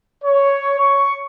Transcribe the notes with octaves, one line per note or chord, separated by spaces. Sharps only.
C#5
C#6